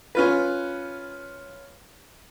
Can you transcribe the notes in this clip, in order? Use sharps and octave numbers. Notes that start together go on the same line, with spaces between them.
C#4 F4 B4